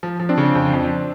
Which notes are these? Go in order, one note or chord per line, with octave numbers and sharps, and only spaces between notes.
F3
F3
C4 D4
C#3
F2
F2